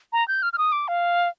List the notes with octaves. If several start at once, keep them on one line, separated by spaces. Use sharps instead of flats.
A#5
G6
F6
F6
D#6
D6
F5